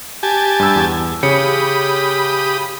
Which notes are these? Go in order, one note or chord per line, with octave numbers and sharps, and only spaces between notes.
G4 G#5 A5
G2 E6
E2
C#3 G4 C#5 B5 D#6 C#7